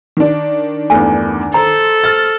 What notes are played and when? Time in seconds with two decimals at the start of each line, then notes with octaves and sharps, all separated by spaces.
0.17 D#3 D4
0.90 E2 G2 A3 G#5
1.54 A4 C5 A#5
2.04 F6 A6